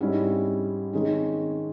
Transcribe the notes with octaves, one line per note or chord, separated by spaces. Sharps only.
G#2 G3 C#4 E4
D#3 G#3 C#4